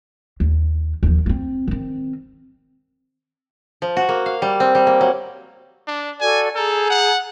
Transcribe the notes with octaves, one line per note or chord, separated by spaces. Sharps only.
D#2
D#2 F3
A#3 C4
D#3 C4
F3
F#4
A#3
F5
G3
C4
G3
A#3
F#3
D4
F#4 A4 D5 G#5
G#4 A4 A#5 G6
F#5